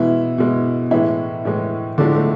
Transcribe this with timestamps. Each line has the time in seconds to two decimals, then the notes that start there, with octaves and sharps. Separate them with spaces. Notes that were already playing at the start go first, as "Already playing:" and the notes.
Already playing: B2 E3 G#3 E4
0.38 B2 G#3
0.91 A2 E3 G#3 E4
1.45 A2 E3 G#3
1.98 A2 D3 F3 G#3 D4
2.15 A3